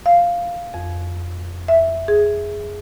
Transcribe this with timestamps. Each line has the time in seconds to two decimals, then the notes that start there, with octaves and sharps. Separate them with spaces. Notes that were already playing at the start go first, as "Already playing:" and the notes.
0.06 F5
0.74 F2
1.68 E5
2.08 G#4